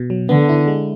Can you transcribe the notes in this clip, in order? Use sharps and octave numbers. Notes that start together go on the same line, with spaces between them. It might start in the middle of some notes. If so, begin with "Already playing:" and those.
Already playing: B2
F#3
D3 B3
E4
G#3